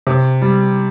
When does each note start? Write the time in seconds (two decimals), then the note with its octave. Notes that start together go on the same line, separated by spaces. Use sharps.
0.07 C3
0.42 G3